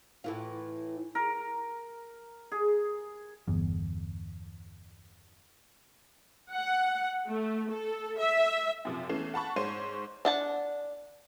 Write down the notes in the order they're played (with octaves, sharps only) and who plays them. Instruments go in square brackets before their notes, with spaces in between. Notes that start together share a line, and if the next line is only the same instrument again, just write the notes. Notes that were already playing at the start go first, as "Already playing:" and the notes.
[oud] A2 E3 F4
[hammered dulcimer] A#4
G#4
[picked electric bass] G1 E2
[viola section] F#5
A3
A4
E5
[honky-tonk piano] F#2 C3 F3
E2 E3 A3 C#4 C7 E7
F#5 A5 B5 C#6
G#2 C5 C#5 C6 D#7
[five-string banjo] D4 F#5 A5